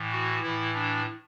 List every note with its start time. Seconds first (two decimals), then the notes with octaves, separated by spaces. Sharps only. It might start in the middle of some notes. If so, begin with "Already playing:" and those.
Already playing: A2 E3
0.12 F#4
0.43 A2 E3 E4
0.74 D4